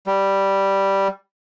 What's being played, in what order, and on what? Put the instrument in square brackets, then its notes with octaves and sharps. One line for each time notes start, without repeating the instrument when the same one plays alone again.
[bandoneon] G3